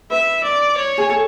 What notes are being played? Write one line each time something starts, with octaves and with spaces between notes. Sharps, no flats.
B4 E5
D5
C#5
G#4
A4